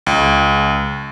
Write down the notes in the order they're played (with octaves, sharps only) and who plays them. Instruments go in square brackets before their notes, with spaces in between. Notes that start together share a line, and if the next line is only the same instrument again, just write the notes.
[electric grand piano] C#2